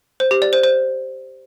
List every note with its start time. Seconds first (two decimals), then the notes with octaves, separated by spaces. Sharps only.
0.20 C5
0.31 G4
0.42 D5
0.53 C5
0.64 C5